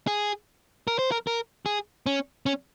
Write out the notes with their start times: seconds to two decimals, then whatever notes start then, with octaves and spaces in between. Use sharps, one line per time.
0.07 G#4
0.88 A#4
0.99 C5
1.12 A#4
1.27 A#4
1.66 G#4
2.06 C#4
2.46 C#4